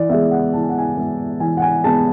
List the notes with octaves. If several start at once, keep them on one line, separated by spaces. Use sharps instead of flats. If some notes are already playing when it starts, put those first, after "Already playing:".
Already playing: E3 D5
G#3 B3 E5
F#5
E3 A5
G#5
F#5
G#5
G#3 B3
E3 G#5
F#5
G#5
G#3 B3 A5